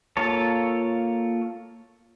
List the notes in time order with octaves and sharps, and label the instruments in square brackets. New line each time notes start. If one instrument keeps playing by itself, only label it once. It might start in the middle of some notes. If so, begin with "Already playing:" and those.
[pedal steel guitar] A#3 F4 A4 C#5 A5